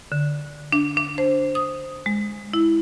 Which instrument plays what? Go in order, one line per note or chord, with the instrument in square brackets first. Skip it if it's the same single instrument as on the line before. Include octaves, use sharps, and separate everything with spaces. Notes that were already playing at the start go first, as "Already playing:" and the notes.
[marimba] D3
D4
D4
C5
D#6
G#3
E4